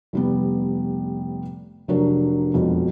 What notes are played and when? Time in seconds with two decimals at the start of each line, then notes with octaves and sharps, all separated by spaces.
0.13 F1 G3 B3
1.88 F1 F#3 D4 A#4
2.54 E1 F2 B2